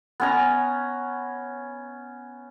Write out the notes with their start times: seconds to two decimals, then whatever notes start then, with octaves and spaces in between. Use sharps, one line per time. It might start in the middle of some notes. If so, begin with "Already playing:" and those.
0.20 B3 C#4 A#5